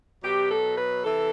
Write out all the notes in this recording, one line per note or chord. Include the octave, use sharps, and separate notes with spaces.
B2 F#3 G4
A4
B4
C3 E3 A4